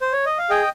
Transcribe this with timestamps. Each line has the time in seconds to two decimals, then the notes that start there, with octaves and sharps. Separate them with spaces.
0.00 C5
0.12 C#5
0.26 D#5
0.38 F5
0.50 G#4 D#5 G5